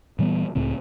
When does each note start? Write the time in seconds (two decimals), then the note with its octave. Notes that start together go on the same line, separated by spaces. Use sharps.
0.19 A#2 E3 G3 B3
0.55 C#2 A2 C#3 C4